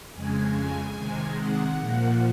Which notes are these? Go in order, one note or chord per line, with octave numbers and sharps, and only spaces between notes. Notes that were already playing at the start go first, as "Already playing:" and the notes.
F2 C#3 G#3 G#5
C3 D#3 G#3
F#5
A#2 F3 A#3